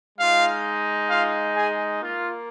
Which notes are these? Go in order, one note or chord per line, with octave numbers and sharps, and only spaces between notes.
G#3 D#4 F4 F5
F4 F5
G#4 G#5
A#3 F4